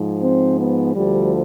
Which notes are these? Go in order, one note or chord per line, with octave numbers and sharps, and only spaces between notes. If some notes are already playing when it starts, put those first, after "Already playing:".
Already playing: G#2 F3
C4
B3
D2 D3 F3 G3